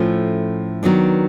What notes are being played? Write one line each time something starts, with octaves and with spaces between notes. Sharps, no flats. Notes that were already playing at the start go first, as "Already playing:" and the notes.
Already playing: A2 F3 A3 C#4
D#3 F#3 B3 D4